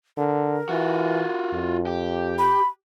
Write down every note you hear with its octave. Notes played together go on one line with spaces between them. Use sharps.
D3 A#4
E3 F4 F#4
F2
G4
B5